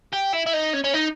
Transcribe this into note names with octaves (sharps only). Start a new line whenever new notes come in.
G4
E4
E4
D#4
C#4
C#4
D#4